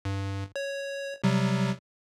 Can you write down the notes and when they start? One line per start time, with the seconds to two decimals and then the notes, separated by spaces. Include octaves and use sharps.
0.05 G2
0.56 C#5
1.24 C3 F#3 G3